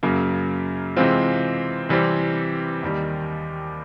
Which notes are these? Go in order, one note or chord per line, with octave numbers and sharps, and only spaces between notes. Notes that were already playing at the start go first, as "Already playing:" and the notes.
F#2 C#3 F#3 A#3
C3 E3 G#3 C4 F4
C3 E3 G3 C4
D#2 D#3 G3